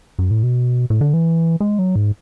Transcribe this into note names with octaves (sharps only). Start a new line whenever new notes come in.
F#2
A2
B2
A2
D3
E3
G#3
F#3
G#2